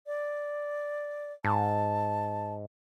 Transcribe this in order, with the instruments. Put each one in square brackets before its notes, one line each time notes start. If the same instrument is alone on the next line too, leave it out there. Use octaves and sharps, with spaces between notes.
[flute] D5
[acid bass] G#2 [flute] A5